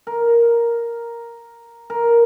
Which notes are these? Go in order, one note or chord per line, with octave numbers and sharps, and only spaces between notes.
A#4
A#4